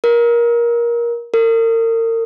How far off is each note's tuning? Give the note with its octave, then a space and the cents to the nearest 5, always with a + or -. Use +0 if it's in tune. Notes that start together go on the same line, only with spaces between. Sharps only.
A#4 +20
A#4 -40